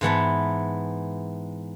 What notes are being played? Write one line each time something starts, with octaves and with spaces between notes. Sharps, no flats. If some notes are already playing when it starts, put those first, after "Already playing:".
G#2 E3 B3 A5